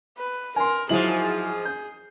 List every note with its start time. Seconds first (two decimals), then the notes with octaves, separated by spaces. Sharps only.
0.17 B4
0.56 A#4 G#5 C6
0.89 G#2 F3 F#3 E4 G#4 F#7
1.65 G6